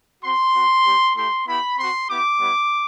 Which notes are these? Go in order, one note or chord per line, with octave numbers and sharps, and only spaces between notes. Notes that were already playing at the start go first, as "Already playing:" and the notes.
C4 F#4 C6
C4 F#4
G3 C4 G4
A3 E4 G4 C6
B3 E4 G4 B5
C4 F#4 C6
B3 E4 G4 D6
G3 B3 E4